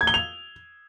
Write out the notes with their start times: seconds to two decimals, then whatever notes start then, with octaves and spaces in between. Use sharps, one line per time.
0.01 G#6
0.07 G7
0.14 F7